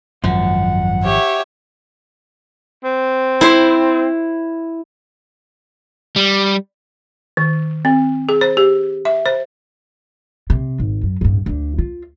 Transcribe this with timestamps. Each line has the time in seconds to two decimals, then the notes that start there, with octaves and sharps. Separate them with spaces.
0.24 G#1 F#2 F3 F#5
1.03 G4 C#5 E5
2.84 C4
3.41 E4 C5
6.16 G3
7.37 D#3
7.85 C4
8.29 G#4
8.41 C5
8.57 G4
9.05 E5
9.26 C5
10.50 C3
10.79 G#1
11.03 F#2
11.21 D1 G2
11.46 D2 D3
11.78 F4